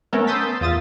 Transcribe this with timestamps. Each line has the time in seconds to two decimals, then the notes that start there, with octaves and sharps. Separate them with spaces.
0.13 A3 B3 C#4 A4 A#4
0.27 C6 D#6 E6 G6 A6 B6
0.61 E2 F4 D#6 A6